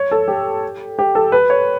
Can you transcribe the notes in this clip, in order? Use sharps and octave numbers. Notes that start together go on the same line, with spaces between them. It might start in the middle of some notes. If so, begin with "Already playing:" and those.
Already playing: C#5
A4
G4
G4
A4
B4
C#5